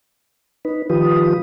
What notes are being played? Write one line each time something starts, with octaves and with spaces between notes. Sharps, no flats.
D#4 B4
D#3 F3 F4 G4 B4 D#6